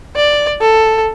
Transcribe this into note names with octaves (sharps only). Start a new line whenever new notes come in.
D5
A4